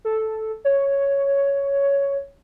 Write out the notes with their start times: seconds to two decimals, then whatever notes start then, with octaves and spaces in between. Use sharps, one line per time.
0.05 A4
0.65 C#5